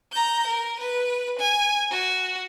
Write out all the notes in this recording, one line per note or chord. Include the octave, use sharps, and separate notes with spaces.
A#5 G6
A#4
B4
G#5
F#4